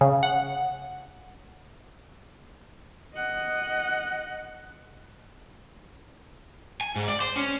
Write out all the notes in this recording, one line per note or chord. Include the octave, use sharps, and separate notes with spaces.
C#3
F#5
D#5 F#5
G#5
G#2
D5
C5
C#4